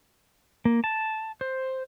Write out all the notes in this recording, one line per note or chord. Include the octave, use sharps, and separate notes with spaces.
A#3
A5
C5